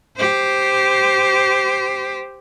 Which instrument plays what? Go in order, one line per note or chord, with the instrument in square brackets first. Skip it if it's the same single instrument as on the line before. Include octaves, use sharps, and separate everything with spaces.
[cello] G4 C5